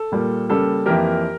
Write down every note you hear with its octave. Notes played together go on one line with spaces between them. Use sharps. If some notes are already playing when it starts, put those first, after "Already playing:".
Already playing: A4
A#2 G3 A#3
C#3 G3 A#3 A4
F2 E3 A#3 G4 A#4